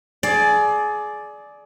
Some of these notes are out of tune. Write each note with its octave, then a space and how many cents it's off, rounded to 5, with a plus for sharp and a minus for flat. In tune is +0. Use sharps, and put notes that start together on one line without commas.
G#4 +25 D5 +0